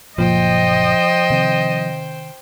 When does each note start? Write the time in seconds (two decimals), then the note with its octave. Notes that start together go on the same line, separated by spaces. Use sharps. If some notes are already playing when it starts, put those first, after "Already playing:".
0.18 F#1 A#2 F3 A#3 C5 D#5 G5
1.30 C3 D#3 C4